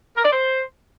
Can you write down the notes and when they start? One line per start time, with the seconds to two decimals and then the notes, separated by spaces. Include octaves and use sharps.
0.17 A#4
0.24 D5
0.32 C5